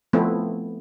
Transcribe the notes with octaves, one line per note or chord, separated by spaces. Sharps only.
F3 A3 B3 C4 E4